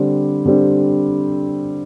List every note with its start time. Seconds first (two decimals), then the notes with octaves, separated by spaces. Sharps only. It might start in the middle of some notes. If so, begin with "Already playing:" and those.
Already playing: D3 G3 C4
0.46 D3 G3 C4